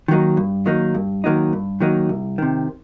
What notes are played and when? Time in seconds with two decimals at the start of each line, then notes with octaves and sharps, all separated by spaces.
0.08 D#3 F#3 A#3 D#4
0.37 G2
0.66 D#3 F#3 A#3 D#4
0.95 G2
1.24 D#3 F#3 A#3 D#4
1.53 G2
1.80 D#3 F#3 A#3 D#4
2.09 C2
2.38 C3 D#3